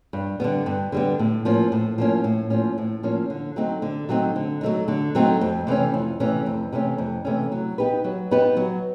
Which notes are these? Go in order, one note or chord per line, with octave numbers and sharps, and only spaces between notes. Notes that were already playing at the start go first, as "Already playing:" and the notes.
G2
D3 G3 B3
G2
D3 G3 B3
A2
F3 A#3 C#4
A2
F3 A#3 C#4
A2
F3 A#3 C#4
A2
F3 A#3 C#4
D3
F#3 A3 C4 D#4
D3
F#3 A3 C4 D#4
D3
F#3 A3 C4 D#4
D3
F#3 A3 C4 D#4
F2
C3 E3 A3 C#4
F2
C3 E3 A3 C#4
F2
C3 E3 A3 C#4
F2
C3 E3 A3 C#4
F#3
B3 D#4 G4 B4
F#3
B3 D#4 G4 B4
F#3